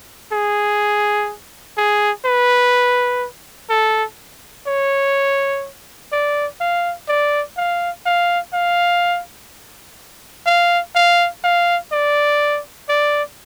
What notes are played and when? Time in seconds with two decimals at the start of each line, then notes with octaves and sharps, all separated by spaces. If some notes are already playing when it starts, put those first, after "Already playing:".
0.32 G#4
1.77 G#4
2.25 B4
3.70 A4
4.67 C#5
6.12 D5
6.61 F5
7.08 D5
7.57 F5
8.06 F5
8.53 F5
10.46 F5
10.95 F5
11.44 F5
11.92 D5
12.89 D5